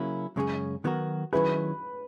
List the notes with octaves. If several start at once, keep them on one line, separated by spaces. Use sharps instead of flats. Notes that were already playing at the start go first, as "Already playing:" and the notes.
Already playing: C#3 F#3 A#3 C#4 E4
F#2 C#3 G#3 C#4 G#4
D#3 F#3 B3 F#4 A#4
D#3 F#3 C#4 E4 G#4 B4